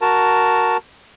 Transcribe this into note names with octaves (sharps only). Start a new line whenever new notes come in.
F#4 A#4 A5